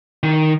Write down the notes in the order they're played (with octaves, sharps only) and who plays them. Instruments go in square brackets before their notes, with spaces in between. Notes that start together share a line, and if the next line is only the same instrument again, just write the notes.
[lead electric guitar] D#3